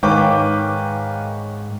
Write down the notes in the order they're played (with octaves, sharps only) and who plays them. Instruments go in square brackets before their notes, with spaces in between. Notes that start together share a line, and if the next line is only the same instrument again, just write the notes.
[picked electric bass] G#2 [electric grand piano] D#3 B4 F5 [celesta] C#5 C#6 [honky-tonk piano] G5 D6